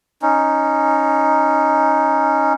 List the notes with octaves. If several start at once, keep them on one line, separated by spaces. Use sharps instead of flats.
C#4 D#4